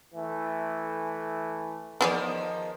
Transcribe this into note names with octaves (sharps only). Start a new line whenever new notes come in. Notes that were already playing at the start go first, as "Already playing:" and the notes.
E3 A3
D#3 F3 B3 G#4 D5